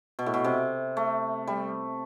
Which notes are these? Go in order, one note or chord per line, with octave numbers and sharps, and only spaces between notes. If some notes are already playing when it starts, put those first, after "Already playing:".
B2
A2
B2
C3
A3
G3